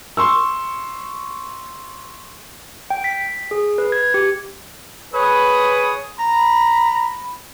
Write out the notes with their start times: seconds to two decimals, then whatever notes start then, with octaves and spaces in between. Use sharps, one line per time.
0.17 C6 C#6 E6
2.90 G5
3.04 B6
3.51 G#4
3.78 B4
3.92 G#6
4.14 G4
5.14 G#4 B4 C#5 D#6
6.19 A#5 B5